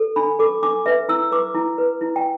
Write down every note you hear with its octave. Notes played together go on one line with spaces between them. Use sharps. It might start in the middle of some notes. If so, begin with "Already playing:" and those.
Already playing: A4
D4 B5
A4 D6
D4 D6
B4 E5
E4 E6
B4 D6
E4
B4
E4
G5